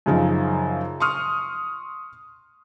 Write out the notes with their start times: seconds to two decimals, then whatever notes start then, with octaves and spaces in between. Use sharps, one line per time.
0.06 F#2 C#3 F3 D#4
1.00 C6 C#6 D#6 F6